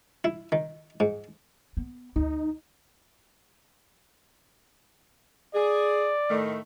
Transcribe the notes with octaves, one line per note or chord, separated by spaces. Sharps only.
E4
D#3
G#2
B3
D2 D#4
G#4 D5
A2 D#3 A3